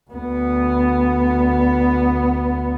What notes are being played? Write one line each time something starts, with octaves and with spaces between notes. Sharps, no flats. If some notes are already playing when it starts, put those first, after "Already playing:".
D2 B3